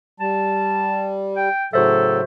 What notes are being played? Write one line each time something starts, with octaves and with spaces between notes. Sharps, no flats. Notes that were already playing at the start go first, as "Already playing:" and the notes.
G3 A5
G5
A2 C#3 F#3 F#4 A4 C5 E5